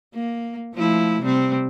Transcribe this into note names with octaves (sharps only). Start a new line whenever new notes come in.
A#3
F3 A3 E4
C3 G3 C4